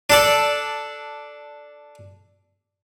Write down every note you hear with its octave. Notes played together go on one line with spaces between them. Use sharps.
D4 A4 D5